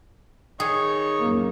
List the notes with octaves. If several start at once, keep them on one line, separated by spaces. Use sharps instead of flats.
D#3 D#4 G#4 C#5
F#2 A#3